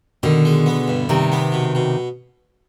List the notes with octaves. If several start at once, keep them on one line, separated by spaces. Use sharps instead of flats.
B2 D3 D#3
G#3
B3
G2
C3 D#3 G3
B3
B2
B2